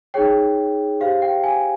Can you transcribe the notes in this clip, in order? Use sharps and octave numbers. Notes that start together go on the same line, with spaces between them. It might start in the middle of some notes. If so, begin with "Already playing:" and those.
D#4 G#4 C#5 G5
G4 C5 F5
G5
G#5